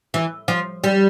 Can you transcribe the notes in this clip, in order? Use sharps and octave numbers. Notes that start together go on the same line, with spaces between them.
E3
F3
G3